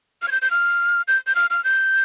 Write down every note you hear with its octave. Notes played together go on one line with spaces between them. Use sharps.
F6
G#6
G6
G6
F6
G6
G6
F6
F6
G6